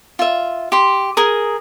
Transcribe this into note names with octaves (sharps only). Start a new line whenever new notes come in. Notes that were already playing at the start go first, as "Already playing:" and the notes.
F4 E5
G4 C6
G#4 A#4 D#6